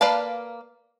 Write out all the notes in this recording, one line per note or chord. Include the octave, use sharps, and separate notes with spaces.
A#3 B4 D5 F5 A5